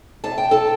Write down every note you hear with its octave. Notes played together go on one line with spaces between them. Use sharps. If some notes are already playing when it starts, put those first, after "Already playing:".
C3 A5
G5
A4 A5